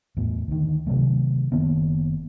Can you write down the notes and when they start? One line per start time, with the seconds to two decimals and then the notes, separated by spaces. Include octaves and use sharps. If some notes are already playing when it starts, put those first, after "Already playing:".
0.17 E2 A2
0.48 D2 D#3
0.87 C3 D#3 F#3 A3
1.52 F#1 D#3 A#3 B3